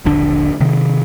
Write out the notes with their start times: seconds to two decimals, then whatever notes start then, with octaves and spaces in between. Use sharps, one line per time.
0.05 D#1 A#1 D3 D4
0.60 C3 D#3